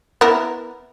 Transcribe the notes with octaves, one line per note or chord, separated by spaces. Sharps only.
B3 E4 A#4